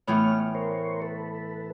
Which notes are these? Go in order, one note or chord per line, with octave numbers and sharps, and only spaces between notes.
A2 E3 B3 C#5 F6
A#4 C5 C#5
A4 B4